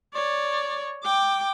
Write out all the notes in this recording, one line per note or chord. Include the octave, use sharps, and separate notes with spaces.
C#5 D5
G5 D6